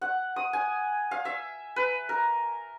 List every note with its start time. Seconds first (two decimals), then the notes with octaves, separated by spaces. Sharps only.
0.01 F#5
0.36 D#6
0.53 G#5
1.11 F5
1.25 E5
1.76 B4
2.09 A#4